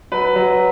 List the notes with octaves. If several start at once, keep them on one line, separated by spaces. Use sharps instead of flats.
F#3 B4
F#3